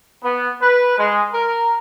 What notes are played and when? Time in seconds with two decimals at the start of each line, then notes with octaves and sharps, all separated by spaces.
0.23 B3
0.61 B4
0.98 G#3
1.33 A#4